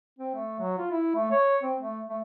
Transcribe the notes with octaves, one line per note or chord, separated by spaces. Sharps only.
C4
A3
F#3
F4
E4
A3
C#5
C4
A3
A3